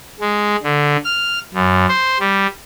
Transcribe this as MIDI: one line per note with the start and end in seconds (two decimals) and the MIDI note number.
0.20 0.56 56
0.63 0.97 50
1.05 1.39 89
1.54 1.86 42
1.89 2.18 72
2.20 2.47 55